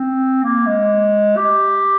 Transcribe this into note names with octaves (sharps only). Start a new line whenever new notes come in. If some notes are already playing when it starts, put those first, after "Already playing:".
Already playing: C4
A#3
G#3
G4